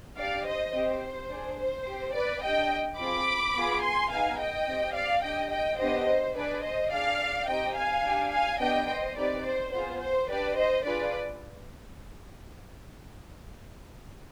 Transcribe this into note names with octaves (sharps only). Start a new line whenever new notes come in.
D4 G4 D5 F5
C5 D#5
C4 G4 C5
D4 G#4
C5
C4 G4
B4 D5
D4 G4 D#5 G5
C4 F4 G#4 B5 D6
B3 F4 G#4
G#5 C6
B3 D#4 G#4 F5 G#5
D#5 G5
C4 G4
D5 F5
D4 G4 D#5 G5
D#5 G5
B3 D4 G4 C5 D#5
C5
D4 G#4 B4 D5
C5 D#5
D4 G#4 D5 F5
C4 D#4 G4 D#5 G5
F5 G#5
D4 G4
F5 G#5
B3 D4 G4 D#5 G5
C5 D#5
C4 D#4 G4 B4 D5
C5
B3 F4 G#4 C5
C5
D4 G4 B4 D5
C5 D#5
D4 F4 G#4 B4 D5